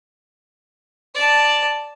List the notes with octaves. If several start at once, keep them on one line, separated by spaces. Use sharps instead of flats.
D5 A5